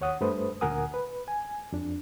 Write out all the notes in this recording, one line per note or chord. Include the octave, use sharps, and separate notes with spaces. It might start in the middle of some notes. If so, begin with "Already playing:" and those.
D#2 C#5 F#5 D#6
G2 A3 B4 C5 D#6
D2 A#2 A#4 F#5 G#5 D#6
B4
G#5
F2 D4